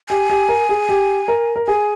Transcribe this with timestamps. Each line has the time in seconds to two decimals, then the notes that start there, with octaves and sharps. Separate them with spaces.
0.09 G4 G#5
0.30 G4
0.49 A#4
0.69 G#4
0.89 G4
1.28 A#4
1.56 A#4
1.67 G#4 G#5